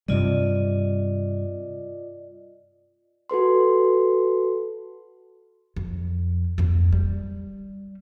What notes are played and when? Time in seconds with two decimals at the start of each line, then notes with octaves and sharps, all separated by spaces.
0.08 G2 C3 G3 F4 D5 D#5
3.30 F#4 A4 B4 C6
5.76 F2
6.58 F2 A#3
6.92 G3